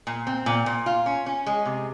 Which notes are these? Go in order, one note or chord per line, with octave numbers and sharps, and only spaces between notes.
A#2
C4
A#2
A#2
F4
C#4
C#4
G#3
C3